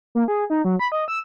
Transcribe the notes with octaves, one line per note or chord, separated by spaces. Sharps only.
A#3
G#4
D#4
F#3
B5
D#5
E6